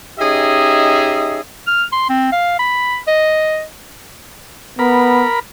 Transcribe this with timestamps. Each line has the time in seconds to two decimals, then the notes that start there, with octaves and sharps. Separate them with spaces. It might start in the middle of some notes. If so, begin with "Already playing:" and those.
0.19 C#4 D#4 G4 G#4 D#5 E5
1.67 F6
1.92 C6
2.09 C4
2.32 F5
2.59 B5
3.08 D#5
4.79 B3 A#4 B5